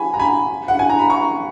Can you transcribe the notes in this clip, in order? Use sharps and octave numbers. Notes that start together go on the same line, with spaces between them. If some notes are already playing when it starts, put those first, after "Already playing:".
Already playing: G#5 B5
A#5
G#5 B5
F#5
G#5
A#5
B5
A#5 C#6